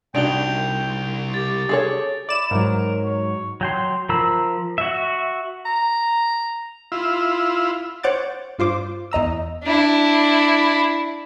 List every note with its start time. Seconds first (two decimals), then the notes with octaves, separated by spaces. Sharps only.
0.15 C2 D4 D#4 F#4 G5 D7 F7 G7
1.34 G4 A6
1.69 G#4 A4 C#5
2.29 E4 D5 E7
2.51 G#2 F#3 A#4
3.05 C#5
3.61 F#3 G5 C6
4.09 F3 A#4 B5 E6
4.78 F#4 E5
5.66 A#5
6.92 E4 F4
8.03 C5 C#5 F#5 D6 G6 A6
8.59 G2 F4 C5 D6
9.12 E2 D#5 A#5 E6
9.63 D4 E4